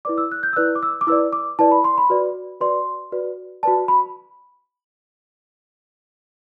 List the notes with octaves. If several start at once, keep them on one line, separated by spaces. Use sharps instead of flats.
E4 B4 D5 D6
E6
F#6
G6
E6
E4 B4 D5 F#6
D6
E6
D6
E4 B4 D5 E6
D6
E4 B4 D5 A5
B5
C6
B5
F#4 B4 D5
F#4 B4 D5 C6
F#4 B4 D5
F#4 B4 D5 A5
B5